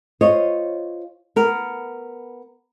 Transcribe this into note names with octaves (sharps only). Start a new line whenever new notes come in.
F4 C5 C#5 D#5
B3 A#4